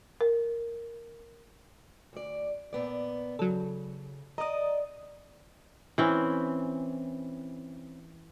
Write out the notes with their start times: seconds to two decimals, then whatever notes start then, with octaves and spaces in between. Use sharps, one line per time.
0.21 A#4
2.13 D2 D5
2.73 A#2 B3 D5
3.39 C#3 F#3 A4
4.38 D5 D#5 A#5 D#6
5.98 E3 C4 C#4